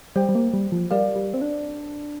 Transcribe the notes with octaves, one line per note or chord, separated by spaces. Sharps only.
G3 G4 C5 G5
G3
A#3
G3
F3
G3 G4 A#4 D5 F5
G3
C4
D4